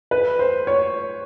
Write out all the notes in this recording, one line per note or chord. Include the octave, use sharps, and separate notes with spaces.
B4
C5
C#5